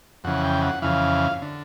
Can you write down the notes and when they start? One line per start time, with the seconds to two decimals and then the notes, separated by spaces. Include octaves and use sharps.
0.24 F2 C#3 E3 F#5
0.44 G5
0.62 F#5
0.82 F2 C#3 E3 F5
1.42 D3